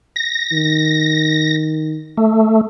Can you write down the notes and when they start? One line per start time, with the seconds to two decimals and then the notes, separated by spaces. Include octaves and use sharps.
0.16 A#6
0.52 D#3
2.17 A3